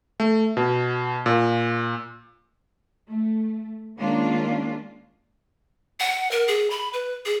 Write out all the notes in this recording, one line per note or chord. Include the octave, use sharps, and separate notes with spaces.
A3
B2
A#2
A3
D#3 G#3 A#3 C#4 D4 F4
F#5
A#4
G#4
B5
B4
G#4